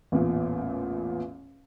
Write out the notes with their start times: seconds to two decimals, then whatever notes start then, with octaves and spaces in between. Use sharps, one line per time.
0.12 A1 E2 A#2